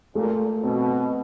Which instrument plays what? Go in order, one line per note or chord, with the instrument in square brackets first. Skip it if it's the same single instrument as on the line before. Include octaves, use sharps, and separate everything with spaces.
[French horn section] A#2 [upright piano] A3
[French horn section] B2 [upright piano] C4